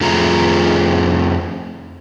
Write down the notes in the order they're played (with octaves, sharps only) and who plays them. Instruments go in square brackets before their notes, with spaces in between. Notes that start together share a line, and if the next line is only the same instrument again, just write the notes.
[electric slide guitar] F2 A3 F4 G#4 A#5